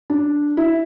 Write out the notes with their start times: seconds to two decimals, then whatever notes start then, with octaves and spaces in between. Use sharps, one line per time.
0.10 D4
0.57 E4